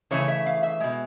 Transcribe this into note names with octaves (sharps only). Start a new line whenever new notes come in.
C#3 E3 A3 C#5
E5
F5
E5
B2 G#3